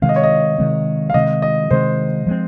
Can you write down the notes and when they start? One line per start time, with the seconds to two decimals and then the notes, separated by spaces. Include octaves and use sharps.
0.02 C3 D#3 G#3 C4 F5
0.09 D#5
0.16 C#5
0.24 D#5
0.58 C3 D#3 G#3 C4
1.10 F5
1.14 C3 D#3 G#3 C4 D#5
1.42 D#5
1.71 C3 D#3 G#3 C4 C5
2.27 F3 G#3 C4